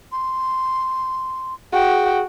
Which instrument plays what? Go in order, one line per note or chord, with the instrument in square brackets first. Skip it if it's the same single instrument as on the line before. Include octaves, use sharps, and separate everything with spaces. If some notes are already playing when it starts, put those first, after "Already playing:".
[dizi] C6
[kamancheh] F#4 G5 [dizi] G#4